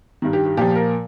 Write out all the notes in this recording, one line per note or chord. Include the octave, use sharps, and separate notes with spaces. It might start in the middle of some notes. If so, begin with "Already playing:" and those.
G2 D#3
G4
G4
A#2 F3 G4
A#4